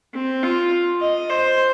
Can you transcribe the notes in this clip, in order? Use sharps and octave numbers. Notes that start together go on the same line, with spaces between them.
C4
F4
D#5
C5